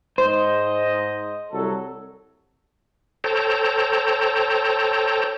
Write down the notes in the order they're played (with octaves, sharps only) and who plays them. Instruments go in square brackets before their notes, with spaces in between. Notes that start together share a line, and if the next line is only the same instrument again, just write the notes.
[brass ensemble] G#2 D#5 [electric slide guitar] C5
[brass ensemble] C2 F#3 A4
[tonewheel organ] A4 C5 C#5 G5 A5 A#5